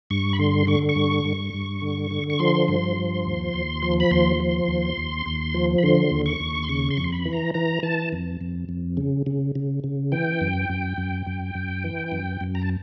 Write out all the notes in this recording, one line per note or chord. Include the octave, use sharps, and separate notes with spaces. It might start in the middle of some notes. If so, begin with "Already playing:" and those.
G2 C#6
B5
D3 C6
D3 C#6
C#6
G2
G2
G2
D3
D3
C#6
F3 C6
G2
F3
D#2
D#2
F3
B5
D#2 C6
F3
D#2
D#2
D#2
F3
B5
D3 C6
D#2
C#6
D#2
C6
C#3 C#6
C6
F2 C#6
C6
B5
E3
A#5
E3 A#5
E3 A5
F2
F2
F2
C#3
C#3
C#3
C#3
E3 G5
F#2
F#2
F#2
F#2
F#2
E3
F#2
F#2
A#5
A5